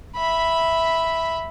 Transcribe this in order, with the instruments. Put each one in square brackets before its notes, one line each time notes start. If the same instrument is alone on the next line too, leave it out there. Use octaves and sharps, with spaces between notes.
[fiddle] E5 B5